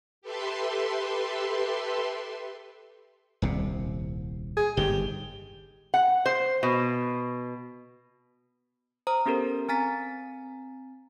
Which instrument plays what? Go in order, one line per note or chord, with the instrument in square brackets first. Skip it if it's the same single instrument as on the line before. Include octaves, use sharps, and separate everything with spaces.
[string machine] G4 A4 B4 E5 C6
[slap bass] D#1 C2 C3
[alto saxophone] G#4
[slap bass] G1 G#2 D#3 [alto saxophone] G4
[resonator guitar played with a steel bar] F#5
C5
B2
[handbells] C5 A#5 D#6
B3 C#4 G4 A4 A#4
C4 G#5 A#5 A6 B6